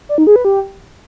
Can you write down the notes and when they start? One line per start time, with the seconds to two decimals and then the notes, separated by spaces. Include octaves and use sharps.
0.09 D5
0.18 D#4
0.27 G#4
0.36 B4
0.45 G4